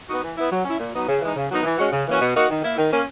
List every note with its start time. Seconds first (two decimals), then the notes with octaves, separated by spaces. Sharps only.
0.08 B3 D#4 F#4
0.22 E3
0.36 B3 E4
0.51 F#3
0.64 C#4 E4
0.79 A#2
0.93 F#3 B3 D#4
1.07 C#3
1.21 E3 G#3 D#4
1.35 C#3
1.50 F#3 B3 D#4
1.63 E3
1.78 G#3 C#4 F#4
1.92 C#3
2.06 E3 A#3 C#4 F#4
2.21 B2
2.34 A#3 D#4 F#4
2.49 D#3
2.63 A#3 E4
2.77 D#3
2.91 A#3 C#4